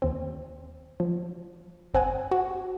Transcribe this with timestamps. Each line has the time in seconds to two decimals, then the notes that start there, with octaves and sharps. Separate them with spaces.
0.02 D#2 C4
1.00 F3
1.94 G1 C4 F#5 G#5 D#6
2.31 F#4